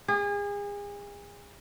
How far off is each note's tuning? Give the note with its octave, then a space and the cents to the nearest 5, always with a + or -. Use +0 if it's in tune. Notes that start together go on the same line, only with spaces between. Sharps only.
G#4 -35